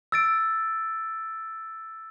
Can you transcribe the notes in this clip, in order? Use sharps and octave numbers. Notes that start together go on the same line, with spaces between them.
E6 A6 D7